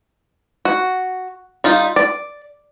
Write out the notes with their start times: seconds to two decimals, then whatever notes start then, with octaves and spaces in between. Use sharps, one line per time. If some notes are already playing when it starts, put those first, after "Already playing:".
0.65 F#4
1.64 G3 D#4 F4
1.96 D5